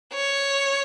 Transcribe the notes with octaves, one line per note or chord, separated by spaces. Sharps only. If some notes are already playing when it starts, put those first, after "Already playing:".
C#5